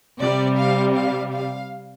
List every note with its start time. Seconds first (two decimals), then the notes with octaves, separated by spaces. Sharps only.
0.20 C3 G3 D5
0.57 F5
0.96 F5
1.33 F5